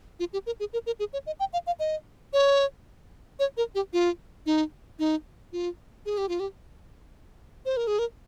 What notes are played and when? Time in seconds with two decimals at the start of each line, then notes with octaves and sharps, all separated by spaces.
0.20 F4
0.33 G4
0.46 A#4
0.60 G#4
0.73 A#4
0.86 A#4
0.99 G#4
1.13 C#5
1.26 D#5
1.40 G5
1.53 F5
1.67 F5
1.79 D#5
2.33 C#5
3.39 C#5
3.57 A#4
3.75 G4
3.93 F4
4.46 D#4
4.99 D#4
5.53 F4
6.06 G#4
6.18 G4
6.29 F4
6.40 G4
7.66 C5
7.77 A#4
7.87 G#4
7.99 A#4